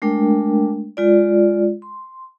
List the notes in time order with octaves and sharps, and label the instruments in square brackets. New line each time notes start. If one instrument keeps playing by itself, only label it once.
[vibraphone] G#3 A3 D4 A#4 G5
G#3 F4 D5
C6